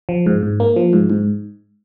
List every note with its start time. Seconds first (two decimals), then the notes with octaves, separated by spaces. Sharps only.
0.09 F3
0.26 G#2
0.43 G#2
0.60 A#3
0.76 F3
0.93 G#2
1.10 G#2